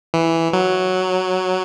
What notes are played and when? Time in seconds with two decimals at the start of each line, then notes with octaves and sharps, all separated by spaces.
0.14 E3
0.53 F#3